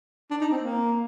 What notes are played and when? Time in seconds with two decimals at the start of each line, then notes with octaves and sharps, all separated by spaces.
0.31 D4
0.41 D#4
0.52 C4
0.63 A#3